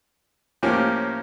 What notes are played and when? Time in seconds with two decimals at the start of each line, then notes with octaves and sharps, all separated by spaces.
0.63 A2 F3 A#3 C#4 G4